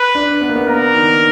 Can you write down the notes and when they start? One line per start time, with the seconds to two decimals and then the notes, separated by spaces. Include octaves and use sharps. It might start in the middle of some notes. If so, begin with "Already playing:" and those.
Already playing: B4
0.15 D4
0.41 B3
0.49 A#3
0.56 B3
0.68 A#3 A#4
0.95 D#3